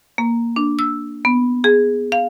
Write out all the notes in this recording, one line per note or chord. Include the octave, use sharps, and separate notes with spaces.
A#3
D4
E6
B3
G#4
F5